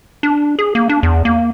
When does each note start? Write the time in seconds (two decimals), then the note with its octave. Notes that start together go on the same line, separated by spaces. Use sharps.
0.23 D4
0.59 G#4
0.75 A#3
0.89 D4
1.03 E2
1.25 A#3